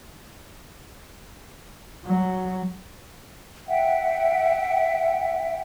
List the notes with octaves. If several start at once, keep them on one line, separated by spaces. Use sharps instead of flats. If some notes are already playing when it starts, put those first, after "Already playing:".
F#3
E5 F#5 G5